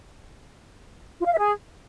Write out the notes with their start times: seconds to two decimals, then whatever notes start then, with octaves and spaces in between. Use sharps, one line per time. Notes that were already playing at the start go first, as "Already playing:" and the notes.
1.19 F4
1.25 F5
1.31 E5
1.38 G#4